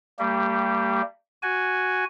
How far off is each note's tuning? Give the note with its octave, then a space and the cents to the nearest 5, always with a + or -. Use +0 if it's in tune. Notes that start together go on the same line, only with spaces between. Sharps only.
G3 +0 A#3 -40 G4 -5
F#4 +0 G#5 +0